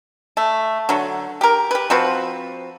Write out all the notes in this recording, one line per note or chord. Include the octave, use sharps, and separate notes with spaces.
A3
D3 F#3
G4 A#4
G4 B4
F3 C4 F#4 B4